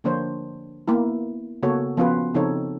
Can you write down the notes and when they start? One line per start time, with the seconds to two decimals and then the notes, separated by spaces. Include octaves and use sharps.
0.04 D3 F3 A#3 D4 C5 C#5
0.88 A#3 B3 E4
1.63 C#3 A#3 B3 F#4 A4 C#5
1.97 F3 B3 C#4 F4 F#4 B4
2.34 C#3 F3 C4 D#4 A4 C#5